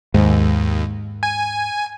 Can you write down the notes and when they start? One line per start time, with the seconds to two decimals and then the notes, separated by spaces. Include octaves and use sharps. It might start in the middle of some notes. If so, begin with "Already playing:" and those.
0.14 D#2 G#2
1.23 G#5